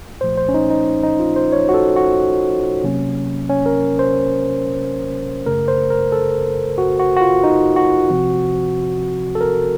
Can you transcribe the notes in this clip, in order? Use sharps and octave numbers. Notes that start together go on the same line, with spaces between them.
C2 A#2 F3 A3 C5
C5
C#4
D#4
D#4
D#4
F4
C5
C#5
F#4
A4
F#4
C3 F#3 A#3 C#4
C#4
A#4
C5
F#2 C#3 A3 A#4
C5
A#4
A4
F#4
F#4
F#4
F4
D#4
F#4
C3 F3 C4
A4
A#4